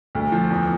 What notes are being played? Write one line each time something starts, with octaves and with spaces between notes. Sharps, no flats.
D2
F3
E2